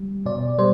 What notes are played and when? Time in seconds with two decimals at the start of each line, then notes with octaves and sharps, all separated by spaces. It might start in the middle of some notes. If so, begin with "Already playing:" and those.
Already playing: G3
0.26 B2 D5
0.58 G3 C5